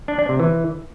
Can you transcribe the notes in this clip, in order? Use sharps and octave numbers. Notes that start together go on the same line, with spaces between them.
D4
D4
C3
E3